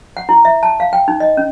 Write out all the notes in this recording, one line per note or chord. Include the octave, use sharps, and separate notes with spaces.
F#5
E4
E5
A5
F5
G5
D#4
D#5
C#4